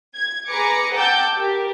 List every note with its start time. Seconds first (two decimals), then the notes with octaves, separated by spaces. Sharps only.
0.15 G#6
0.48 G#4 B4 A#5 D6 A#6 C#7
0.94 F#5 G5 A5 D6 E6 G6
1.34 G4 A#4